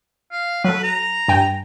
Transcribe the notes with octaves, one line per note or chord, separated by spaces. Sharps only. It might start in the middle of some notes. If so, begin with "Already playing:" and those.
F5
F#3 A4 B4
A#5
G2 G5 G#5